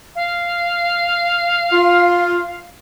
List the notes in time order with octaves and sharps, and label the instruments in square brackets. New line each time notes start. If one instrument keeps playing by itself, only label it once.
[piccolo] F5
[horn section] F4